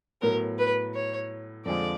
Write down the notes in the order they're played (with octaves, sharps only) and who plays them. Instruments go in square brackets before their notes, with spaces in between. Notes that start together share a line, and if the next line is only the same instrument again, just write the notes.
[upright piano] A2 F#3 B3 [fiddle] A#4
[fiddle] B4
C#5
[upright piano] F2 D3 F3 G#3 [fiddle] D5